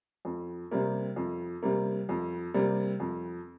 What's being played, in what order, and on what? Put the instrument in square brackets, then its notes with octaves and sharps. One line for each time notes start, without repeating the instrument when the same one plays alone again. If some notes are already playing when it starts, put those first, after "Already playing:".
[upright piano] F2
C3 G3 A#3
F2
C3 G3 A#3
F2
C3 G3 A#3
F2